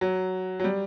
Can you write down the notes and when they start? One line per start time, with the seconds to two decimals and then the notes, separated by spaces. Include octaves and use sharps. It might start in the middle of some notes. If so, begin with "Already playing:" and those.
0.01 F#3
0.60 F#3
0.64 G3